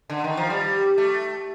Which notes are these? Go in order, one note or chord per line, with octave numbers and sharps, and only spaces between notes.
D3
D#3
F3
G3
A3